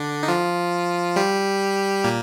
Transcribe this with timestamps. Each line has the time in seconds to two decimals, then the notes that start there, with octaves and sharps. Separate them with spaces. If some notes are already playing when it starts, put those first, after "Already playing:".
Already playing: D3 D4
0.23 D#4
0.28 F3 F4
1.16 G3 G4
2.04 A#2 A#3